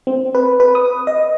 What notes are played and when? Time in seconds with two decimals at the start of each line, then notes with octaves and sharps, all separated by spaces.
0.07 C4
0.35 B4
0.60 B4
0.75 D#6
1.07 D#5